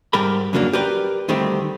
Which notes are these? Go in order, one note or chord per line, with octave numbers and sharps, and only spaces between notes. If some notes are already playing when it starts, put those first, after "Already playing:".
G#2 G3 G4 A#4 B5
F2 C#3 F#3 A#3 D4
G4 A#4 B4 D5 G5
D2 D#3 G3 A3 C4 G4